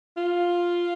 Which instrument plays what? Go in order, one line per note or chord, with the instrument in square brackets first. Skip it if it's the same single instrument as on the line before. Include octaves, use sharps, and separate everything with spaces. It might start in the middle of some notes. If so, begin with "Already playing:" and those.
[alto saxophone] F4